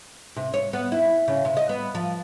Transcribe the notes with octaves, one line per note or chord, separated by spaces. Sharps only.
C3
C#5
B3
E4
C#3
C3
D#5
B3
F3